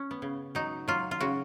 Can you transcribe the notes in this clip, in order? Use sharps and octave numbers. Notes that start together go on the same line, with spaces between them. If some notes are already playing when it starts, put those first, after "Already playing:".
Already playing: C#4
B3
C#3
F#3 D#4
F#3 F4
F4
C#3 F#4